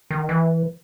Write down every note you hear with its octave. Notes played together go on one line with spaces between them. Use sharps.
D#3
E3